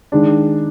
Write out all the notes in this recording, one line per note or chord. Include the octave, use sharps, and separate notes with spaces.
D#3 G#3 D4